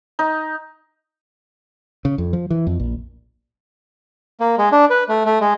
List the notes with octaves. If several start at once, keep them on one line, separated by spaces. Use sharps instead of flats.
D#4
C#3
F2
F3
E3
F2
A#1
A#3
G#3
D4
B4
A3
A3
G#3